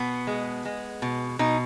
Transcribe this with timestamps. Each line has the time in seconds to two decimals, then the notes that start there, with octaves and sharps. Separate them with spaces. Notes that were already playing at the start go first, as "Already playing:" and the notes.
Already playing: B2 B3
0.27 G#3
0.65 G#3
1.02 B2
1.39 B2 D#4